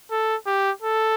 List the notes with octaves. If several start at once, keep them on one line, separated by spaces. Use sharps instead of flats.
A4
G4
A4